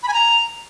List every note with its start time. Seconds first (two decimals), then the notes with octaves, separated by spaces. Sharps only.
0.03 B5
0.08 G#5
0.13 A#5